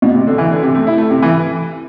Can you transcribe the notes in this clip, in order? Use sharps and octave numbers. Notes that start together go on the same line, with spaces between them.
B2
C3
D3
E3
D3
C3
A3
E4
A3
C3
E3